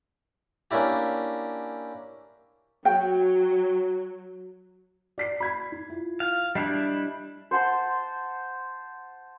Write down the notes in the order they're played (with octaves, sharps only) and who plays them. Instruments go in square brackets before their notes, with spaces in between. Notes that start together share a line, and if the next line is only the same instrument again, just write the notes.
[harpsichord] A#3 C#4 D4 E4 G4
[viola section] F#3 [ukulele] G5
[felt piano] D5 B6 C7
B5 G#6 B6
D#4
E4 F4
[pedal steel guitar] F5
[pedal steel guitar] G3 D4 E4 [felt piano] D#5 B6 C7
[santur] C5 F#5 A5 C6